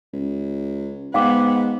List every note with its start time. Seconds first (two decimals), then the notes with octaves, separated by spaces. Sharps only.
0.13 C#2
1.14 G#2 B3 F5 G5 D6